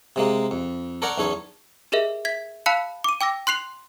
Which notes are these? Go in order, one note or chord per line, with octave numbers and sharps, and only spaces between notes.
C3 G#3 A#3
F2
A4 A#4 C#5 D5 F#5 A#5
B1 E2 C#4 A4 C#5
G4 G#4 A#4 D#5 E5
E5 G#6 B6
F5 A5 B5 E6 F#6 C#7
D6 D#7
G5 D6 E6 A#6
C6 F#6 C7 F7